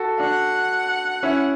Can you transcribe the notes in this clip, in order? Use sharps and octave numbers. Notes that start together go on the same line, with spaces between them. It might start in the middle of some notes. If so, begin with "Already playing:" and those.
Already playing: F#4 A4
D4 F#4 F#5
C#4 E4